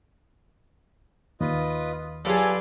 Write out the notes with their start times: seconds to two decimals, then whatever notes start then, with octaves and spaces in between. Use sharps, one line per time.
1.41 D#2 F4 B4 D#5
2.25 F#3 G3 F4 G#4 A4 B4 D5 D6